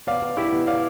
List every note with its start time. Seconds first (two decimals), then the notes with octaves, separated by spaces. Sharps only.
0.07 B2 D5 F5
0.22 B2
0.37 B3 E4 G4
0.52 B2
0.67 B2 D5 F5